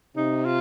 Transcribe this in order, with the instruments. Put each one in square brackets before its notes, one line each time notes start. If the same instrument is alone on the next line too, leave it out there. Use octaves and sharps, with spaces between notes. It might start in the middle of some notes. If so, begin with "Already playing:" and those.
[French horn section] C3 [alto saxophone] D#4
[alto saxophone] F4